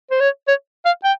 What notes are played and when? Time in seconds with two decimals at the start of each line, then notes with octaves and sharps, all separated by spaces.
0.11 C5
0.20 C#5
0.48 C#5
0.85 F5
1.04 G5